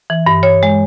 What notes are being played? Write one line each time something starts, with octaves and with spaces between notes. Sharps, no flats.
E3
G2
C#5
G#3